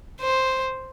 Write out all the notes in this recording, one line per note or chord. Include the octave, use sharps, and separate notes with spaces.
C5